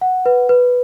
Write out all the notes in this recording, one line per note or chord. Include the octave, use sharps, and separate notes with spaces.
F#5
B4
B4